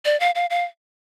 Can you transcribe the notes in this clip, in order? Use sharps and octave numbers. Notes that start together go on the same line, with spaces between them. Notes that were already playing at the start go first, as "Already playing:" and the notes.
D5
F5
F5
F5